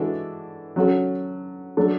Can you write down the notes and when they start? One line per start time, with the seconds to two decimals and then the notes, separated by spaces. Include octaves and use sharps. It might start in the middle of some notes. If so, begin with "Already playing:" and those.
Already playing: E3 G#3 D4 F#4 A4
0.76 F#3 C#4 F#4 A4
1.77 F#3 A3 D4